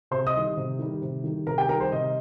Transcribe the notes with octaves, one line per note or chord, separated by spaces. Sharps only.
C3 C5 C6
D#5 D#6
D#3 G3
C3
D#3 G3
C3
D#3 G3
C3 A#4 A#5
G4 G5
D#3 G3 A#4 A#5
C5
C3 D#5